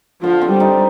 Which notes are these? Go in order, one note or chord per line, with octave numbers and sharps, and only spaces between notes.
D3 F3
C4
G3
D#4